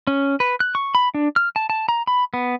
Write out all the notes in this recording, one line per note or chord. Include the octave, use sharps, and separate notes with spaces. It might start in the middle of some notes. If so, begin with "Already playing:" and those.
C#4
B4
F#6
C#6
B5
D4
F6
A5
A5
A#5
B5
B3